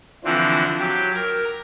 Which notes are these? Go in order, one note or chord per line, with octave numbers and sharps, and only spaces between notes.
D3 E3 F3 C4
F#3 G4
A#4